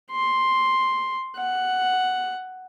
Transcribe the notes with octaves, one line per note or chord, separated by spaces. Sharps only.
C6
F#5